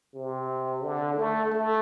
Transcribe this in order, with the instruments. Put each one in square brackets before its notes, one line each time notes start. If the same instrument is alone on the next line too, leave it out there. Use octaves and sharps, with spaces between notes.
[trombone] C3
D3
A3
A3